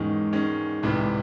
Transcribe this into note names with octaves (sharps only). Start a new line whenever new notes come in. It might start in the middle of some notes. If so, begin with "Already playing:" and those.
Already playing: E2 G#2 D#3 G#3 C#4
D#3 G#3 C#4
C2 A2 C3 E3
G#2
A2